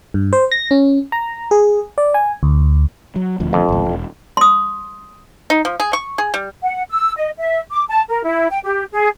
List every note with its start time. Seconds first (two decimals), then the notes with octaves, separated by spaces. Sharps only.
0.14 G2
0.33 C5
0.52 A#6
0.71 C#4
1.12 A#5
1.51 G#4
1.98 D5
2.14 G#5
2.43 D2
3.16 F#3
3.40 D#1 D2 F3
3.53 F2
3.69 G#1 C#2
3.86 E1
4.37 C6 D#6
5.50 D#4
5.65 F3
5.80 G#4
5.93 C#6
6.18 G#4
6.34 G3
6.62 F#5
6.90 E6
7.17 D#5
7.38 E5
7.71 D6
7.89 A5
8.09 A#4
8.24 E4
8.50 G5
8.64 G4
8.92 G#4